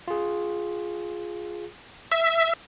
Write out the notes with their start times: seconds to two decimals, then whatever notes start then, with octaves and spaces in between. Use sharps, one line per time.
0.08 F4 G#4
2.12 E5